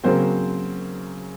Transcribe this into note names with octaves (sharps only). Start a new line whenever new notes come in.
C#3 F#3 A#3 C4 C5